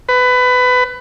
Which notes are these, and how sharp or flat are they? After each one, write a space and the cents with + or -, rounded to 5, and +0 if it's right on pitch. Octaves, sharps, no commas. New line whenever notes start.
B4 +20